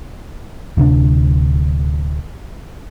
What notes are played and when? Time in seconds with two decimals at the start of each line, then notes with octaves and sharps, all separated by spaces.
0.77 D1 D2 C3 D4